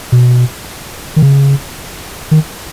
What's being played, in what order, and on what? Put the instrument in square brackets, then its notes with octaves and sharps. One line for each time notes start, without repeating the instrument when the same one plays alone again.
[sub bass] B2
D#3
C#3
D#3